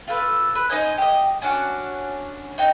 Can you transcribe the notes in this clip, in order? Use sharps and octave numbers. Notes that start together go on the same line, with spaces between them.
F4 A4 B4
B4
D#4 C5 D#5 G#5
G4 D#5
C#4 D4 F#4
D#4 G5 A#5